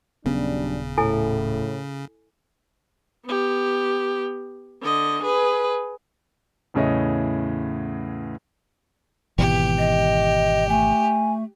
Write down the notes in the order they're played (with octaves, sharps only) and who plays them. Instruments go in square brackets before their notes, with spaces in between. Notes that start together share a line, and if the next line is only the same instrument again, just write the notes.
[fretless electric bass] D#1 B3 C#4 [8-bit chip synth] C#3 [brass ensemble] F#3 G3 D4
[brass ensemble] A2 [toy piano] E4 A4 G#5
[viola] B3 G4
D3 D#5
G#4 B4
[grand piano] E2 A2 C#3 C#5 D#5 E5
[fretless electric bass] G#1 B2 E3 [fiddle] G4
[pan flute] D#5
[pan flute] A3 [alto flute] G#5